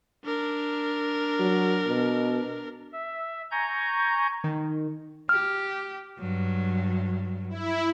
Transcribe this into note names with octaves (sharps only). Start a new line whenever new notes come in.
D4 A#4
F#3
B2
E5
G#5 A#5 C#6 G6
D#3
G4 F6
G2 F#3
E4